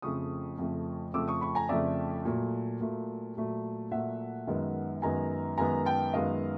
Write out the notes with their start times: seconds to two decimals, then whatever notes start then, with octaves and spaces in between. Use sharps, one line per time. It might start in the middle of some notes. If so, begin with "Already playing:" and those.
0.02 F2 C#3 F3 A3 C#6 D#6
0.58 F2 C#3 F3 A3
1.14 F2 C#3 F3 A3 D6 E6
1.28 C#6 D#6
1.41 B5 C#6
1.55 G#5 A#5
1.69 F2 C#3 F3 A3 D5 E5
2.25 A#2 F#3 A3
2.81 A#2 F#3 A3
3.37 A#2 F#3 A3
3.91 A#2 F#3 A3 E5 F#5
4.47 F#2 D#3 G#3 B3
5.02 F#2 D#3 G#3 B3 G#5 A#5
5.58 F#2 D#3 G#3 B3 G#5 A#5
5.85 G5 A5
6.14 F#2 D#3 G#3 B3 D#5 F5